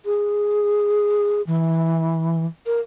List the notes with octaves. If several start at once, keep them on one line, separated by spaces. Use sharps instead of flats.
G#4
E3
A#4